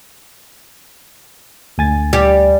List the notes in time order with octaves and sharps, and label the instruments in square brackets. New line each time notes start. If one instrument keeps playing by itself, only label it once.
[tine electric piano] D2 G#5 A6
[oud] G3 G4